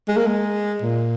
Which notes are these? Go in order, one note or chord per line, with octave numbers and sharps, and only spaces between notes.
G#3
A#3
G#3
A#2